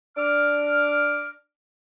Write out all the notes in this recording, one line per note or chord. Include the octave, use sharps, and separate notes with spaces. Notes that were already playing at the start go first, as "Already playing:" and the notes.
D4 D6 F6